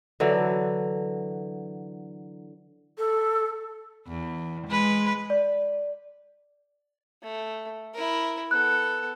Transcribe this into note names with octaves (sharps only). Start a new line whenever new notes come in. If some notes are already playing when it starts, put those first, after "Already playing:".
D3 E3 F#3
A4
E2
G#3 B4
D5
A3
E4 A#4
B3 A4 F#6